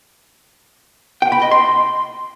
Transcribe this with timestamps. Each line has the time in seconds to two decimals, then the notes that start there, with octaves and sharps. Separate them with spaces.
1.22 G5
1.32 B5
1.42 D#5
1.51 C6